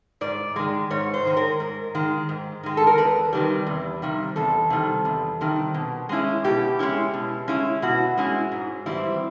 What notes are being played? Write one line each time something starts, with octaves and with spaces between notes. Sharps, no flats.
G#2 D5
D#3 G#3
G#2 C#5
C5
D#3 G#3
A#4
G#2
D#3 G#3
G#2
D#3 G#3
A4
A#4
E2 B4
C3 D#3 G3
E2
C3 D#3 G3
E2 A4
C3 D#3 G3
E2
C3 D#3 G3
B2
G#3 C#4 E4
B2 G4
G#3 C#4 E4
B2
G#3 C#4 E4
B2 F#4
G#3 C#4 E4
G#2
E3 G3 C4 E4